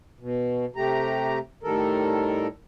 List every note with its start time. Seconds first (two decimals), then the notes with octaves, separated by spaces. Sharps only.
0.20 B2
0.76 C3 A3 G4 A#5
1.63 A2 D#3 G3 A4 A#4